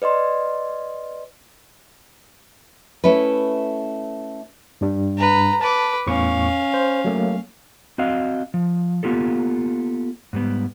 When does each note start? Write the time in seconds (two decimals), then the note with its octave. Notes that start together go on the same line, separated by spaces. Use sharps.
0.02 B4 D5 D#5 C6
3.04 A3 C#4 E4 B4
4.81 G2 G3 D4
5.18 B4 A#5
5.61 B4 A5 D6
6.07 E2 A2 C#4 F5 C#6
6.74 C5
7.05 F#3 A3 A#3
7.98 C4 F#4 D#5 F5
8.54 F3
9.03 A#3 B3 F4 G4 A4
10.33 G#2 G3 B3